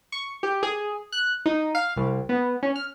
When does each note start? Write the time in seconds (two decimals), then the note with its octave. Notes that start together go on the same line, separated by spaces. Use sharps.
0.12 C#6
0.43 G4
0.63 G#4
1.12 F#6
1.46 D#4
1.75 F5
1.96 C2
2.29 B3
2.63 C#4
2.76 F6